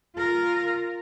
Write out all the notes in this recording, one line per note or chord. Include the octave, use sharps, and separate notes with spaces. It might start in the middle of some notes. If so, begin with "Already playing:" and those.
F4 A#4